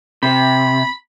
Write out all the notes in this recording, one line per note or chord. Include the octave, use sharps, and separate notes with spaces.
C3 B5